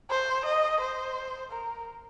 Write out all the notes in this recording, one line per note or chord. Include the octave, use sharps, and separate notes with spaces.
C5
D#5
C5
A#4